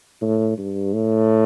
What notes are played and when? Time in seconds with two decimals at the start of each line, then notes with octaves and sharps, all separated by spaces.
0.22 A2
0.58 G2
0.93 A2